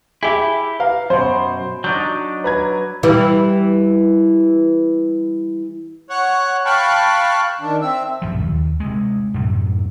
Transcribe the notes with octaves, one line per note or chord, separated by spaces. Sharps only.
E4 G4 G#4 E5
B4 F5 A#5
F#2 B2 C5
F#3 D4 D#4 G6
B4 A#5 G#6
E3 G3
C#5 F#5
F5 G5 A5 B5 C#6 F#6
D#3 D4
C4 E5
A#1 F#2 F3
D#2
C3 G#3
F#2 A2 C3